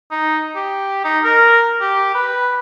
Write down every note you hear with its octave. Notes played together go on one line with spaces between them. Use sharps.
D#4
G4
D#4
A#4
G4
B4